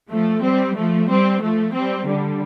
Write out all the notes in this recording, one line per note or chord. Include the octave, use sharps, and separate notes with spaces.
F3 A3
G3 C4
F3 A3
G3 C4
F3 A3
G3 C4
D3 G3